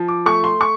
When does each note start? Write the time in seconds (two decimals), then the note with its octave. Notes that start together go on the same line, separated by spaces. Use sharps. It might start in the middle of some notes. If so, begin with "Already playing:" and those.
Already playing: F3
0.08 D6
0.26 A3 C#6
0.44 C6
0.61 C#6